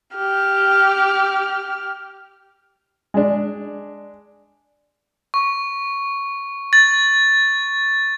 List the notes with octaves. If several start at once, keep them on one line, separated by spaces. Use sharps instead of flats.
G4 F6
G#3 D4
C#6
A6